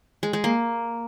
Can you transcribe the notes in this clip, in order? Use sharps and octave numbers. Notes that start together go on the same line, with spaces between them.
G#3
G#3
A#3